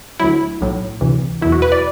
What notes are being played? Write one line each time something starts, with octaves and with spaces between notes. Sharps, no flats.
D2 D3 F#3 E4
B1 A2 F#3
D2 C3 E3
E2 B2 F#3 E4
F#4
B4
D5